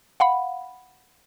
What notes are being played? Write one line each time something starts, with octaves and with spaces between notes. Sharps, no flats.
F5 F#5 B5